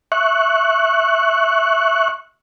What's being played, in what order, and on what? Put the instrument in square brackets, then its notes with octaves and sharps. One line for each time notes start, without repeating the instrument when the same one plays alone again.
[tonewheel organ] E5 C#6 F#6